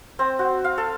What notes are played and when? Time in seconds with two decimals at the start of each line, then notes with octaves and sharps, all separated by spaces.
0.19 C4
0.39 F#4
0.64 F5
0.78 A4